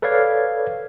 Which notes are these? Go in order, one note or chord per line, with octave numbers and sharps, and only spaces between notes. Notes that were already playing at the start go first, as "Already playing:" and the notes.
A4 B4 C#5 D5 F5 G#6